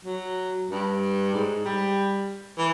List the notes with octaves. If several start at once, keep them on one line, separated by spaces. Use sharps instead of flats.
F#3
G2
G#2
G3
E3